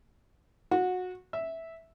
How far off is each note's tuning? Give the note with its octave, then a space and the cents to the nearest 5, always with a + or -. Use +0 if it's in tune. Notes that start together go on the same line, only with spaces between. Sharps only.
F#4 -20
E5 -10